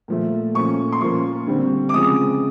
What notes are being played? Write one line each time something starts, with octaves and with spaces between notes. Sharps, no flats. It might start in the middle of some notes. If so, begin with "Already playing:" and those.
A#2 F3 A3
A#2 F3 A3 C#4 C#6
C6
A#2 F3 A#3 C#4 C#6
D3 G3 C4
D6
C#3 F3 G#3 C4 D#6